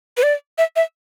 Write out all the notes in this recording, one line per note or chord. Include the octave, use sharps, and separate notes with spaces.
B4
D5
E5
E5